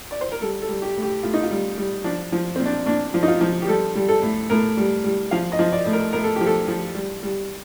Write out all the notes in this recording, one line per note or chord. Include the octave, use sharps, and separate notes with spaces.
D5
C5
A#4
G3 A4
A4
G3
G4
A2
G4
A2 F4
D#4
F4
G3
G3
F3 D4
F3
A#2 C4
D4
A#2 D4
F3
D#4
F4
F3
G4
G3 A4
G3
A4
A2
A2 A#4
G3
G3
F3 F5
D#5
F3
D5
A2
A#4
A2 A#4
A4
F3 G4
A4
F3
G3
G3